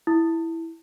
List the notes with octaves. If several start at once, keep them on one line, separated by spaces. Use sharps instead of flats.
E4